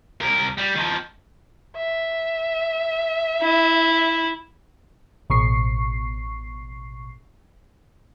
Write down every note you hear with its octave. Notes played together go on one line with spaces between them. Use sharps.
C2 A#4
G3
D#3 F3
E5
E4
A1 B2 C#6 C7